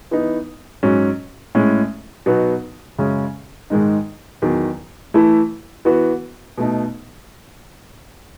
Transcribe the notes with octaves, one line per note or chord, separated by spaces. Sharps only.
E3 B3 D#4
G#2 F#3 C#4
A2 G#3 C#4
B2 F#3 B3 D#4 F#4
F#2 C#3 G#3 C#4
G#2 D#3 G#3 D#4
E2 D#3 F#3
E3 A3 E4
E3 B3 F#4
B2 A3 D#4